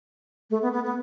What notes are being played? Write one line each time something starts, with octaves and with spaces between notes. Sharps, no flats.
A3
B3
B3
B3